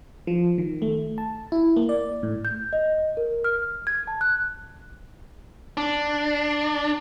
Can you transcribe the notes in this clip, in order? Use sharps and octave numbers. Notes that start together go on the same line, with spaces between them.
F3
D#3
A3
A5
E4
A#3
D5
A2
G6
D#5
A#4
F6
G#6
A5
F#6
D4